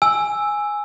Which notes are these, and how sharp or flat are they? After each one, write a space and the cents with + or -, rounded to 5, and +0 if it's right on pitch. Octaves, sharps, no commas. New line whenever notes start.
G#5 +0 E6 +0